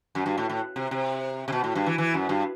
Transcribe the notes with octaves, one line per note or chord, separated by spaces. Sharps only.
F#2
G2
A2
A2
C3
C3
C3
B2
A2
G2
E3
E3
F#2
G2